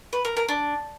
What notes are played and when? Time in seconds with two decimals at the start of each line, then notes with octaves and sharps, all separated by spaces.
0.13 B4
0.25 A#4
0.37 A#4
0.49 D4